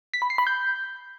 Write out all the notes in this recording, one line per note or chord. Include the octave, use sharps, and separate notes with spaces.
B6
B5
C7
B5
G6